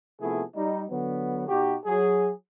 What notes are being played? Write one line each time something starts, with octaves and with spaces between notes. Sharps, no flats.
C3 F3 A3 B3 E4 G#4
G3 D#4
D3 F#3 B3
B2 D#4 F#4 G4
F#3 G#4